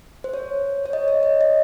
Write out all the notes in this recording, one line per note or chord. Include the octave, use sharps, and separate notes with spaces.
C5
C#5
C#5
D#5
C#5
D#5
D#5